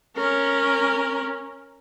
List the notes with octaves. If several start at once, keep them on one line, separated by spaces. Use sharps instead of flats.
C#4 A#4